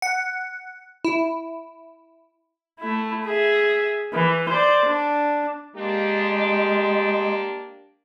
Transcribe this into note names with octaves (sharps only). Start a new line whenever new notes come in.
F#5
E4
A3 E4
G#4 E5
E3
C5 D5
D4
G#3 A#3 D4 G4